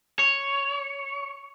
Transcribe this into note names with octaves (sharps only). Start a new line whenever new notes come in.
C#5